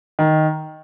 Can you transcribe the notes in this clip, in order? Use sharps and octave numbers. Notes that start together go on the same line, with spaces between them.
D#3